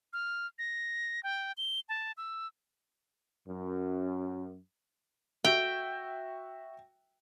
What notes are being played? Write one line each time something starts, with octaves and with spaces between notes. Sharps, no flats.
F6
A#6
G5
G7
A5
E6
F#2
F#4 E5 G5